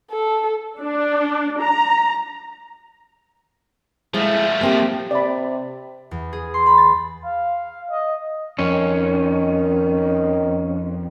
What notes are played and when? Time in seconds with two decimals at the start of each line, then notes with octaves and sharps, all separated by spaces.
0.11 A4
0.79 D4
1.61 A#5
4.14 F3 G#3 A3 E4
4.61 A#3 C4 G4
5.11 C3 D5 B5
6.11 E2
6.33 G#4
6.54 C6
6.66 B5
6.78 A6
7.25 F5
7.91 D#5
8.59 F2 D#3 C#4